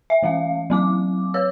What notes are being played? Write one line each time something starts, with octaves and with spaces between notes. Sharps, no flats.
E5
E3 A3 C#4 F5
F#3 C4 D6
B4 C#5 E6